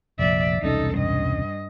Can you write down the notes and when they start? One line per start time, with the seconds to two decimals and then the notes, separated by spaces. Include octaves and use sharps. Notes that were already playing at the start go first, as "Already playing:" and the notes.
0.19 F1 A#1 D5 E5
0.62 E1 C2 C#4 D#4 A4
0.95 G2 D#5